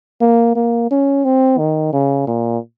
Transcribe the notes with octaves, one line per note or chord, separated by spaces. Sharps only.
A#3
A#3
C#4
C4
D#3
C#3
A#2